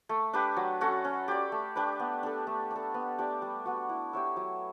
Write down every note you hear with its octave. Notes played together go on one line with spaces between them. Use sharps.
A3
D4 G4 B4
F#3
C#4 F#4 A4
C#4
G4 D5
A3
D4 G4 B4
B3
D4 A4
A3
D4
A4
B3
D4 G4 D5
G3
B3 F#4
E4
G4 C#5 E5
F#3